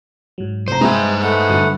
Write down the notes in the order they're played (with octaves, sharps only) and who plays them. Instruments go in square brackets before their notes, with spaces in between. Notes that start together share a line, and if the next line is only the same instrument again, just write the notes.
[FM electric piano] G#2 F#3
[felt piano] F1 A#5 [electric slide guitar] C5
[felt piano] G#3 [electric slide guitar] D#4 C5 [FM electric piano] B4 E5 G5
[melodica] A3 B3 F#5
[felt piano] G1 [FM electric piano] F#3